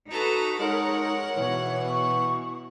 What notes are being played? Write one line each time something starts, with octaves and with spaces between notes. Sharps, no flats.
D#4 F#4 A4 B4 A#5
G#3 D#4 A#4 C#5 F#5
B2 E3 C#5
C#6